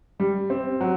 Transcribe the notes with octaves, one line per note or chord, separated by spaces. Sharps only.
G3
C4
F#3